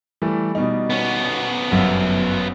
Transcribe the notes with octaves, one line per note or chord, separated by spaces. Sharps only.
E3 G3 A3
B2 G3 D#4
B3 C#4
G1 F#2